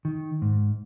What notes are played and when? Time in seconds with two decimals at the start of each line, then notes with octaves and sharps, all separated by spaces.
0.05 D#3
0.42 G#2